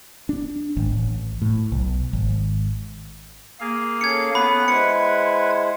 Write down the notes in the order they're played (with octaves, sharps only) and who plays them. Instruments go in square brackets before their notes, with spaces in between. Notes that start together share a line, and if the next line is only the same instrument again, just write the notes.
[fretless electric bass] D4
G#1
A1
A2
B1
G#1
[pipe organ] A#3 G#4 F5
[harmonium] C#4 A4 [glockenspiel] G#6 C#7
[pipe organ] B3 F#5 [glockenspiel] B5
[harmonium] G#3 E4 C5 [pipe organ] B4 F#5 G#6 [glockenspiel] C#7